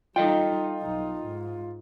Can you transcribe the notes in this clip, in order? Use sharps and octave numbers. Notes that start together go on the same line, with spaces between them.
G3 D#4 F4 A4 D#5 G5
B1 D#4
G#2